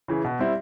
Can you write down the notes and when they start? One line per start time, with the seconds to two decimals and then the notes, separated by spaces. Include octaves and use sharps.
0.08 C#3 E3
0.24 B2
0.39 G3 C4 E4